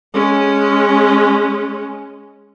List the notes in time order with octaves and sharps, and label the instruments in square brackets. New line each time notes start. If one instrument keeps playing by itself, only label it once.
[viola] G#3 C#4